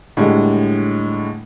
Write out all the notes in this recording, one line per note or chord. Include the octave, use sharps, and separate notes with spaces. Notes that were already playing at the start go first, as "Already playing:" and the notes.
A2 D3 G3 G#3